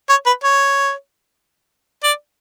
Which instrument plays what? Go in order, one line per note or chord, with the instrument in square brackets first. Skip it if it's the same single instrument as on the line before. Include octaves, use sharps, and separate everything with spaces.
[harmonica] C#5
B4
C#5
D5